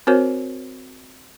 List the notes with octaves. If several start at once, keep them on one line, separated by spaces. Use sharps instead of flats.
C4 F#4 A#4 C5 C#5